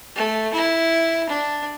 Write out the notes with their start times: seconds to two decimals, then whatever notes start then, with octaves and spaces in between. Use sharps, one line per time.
0.15 A3
0.54 E4
1.29 D4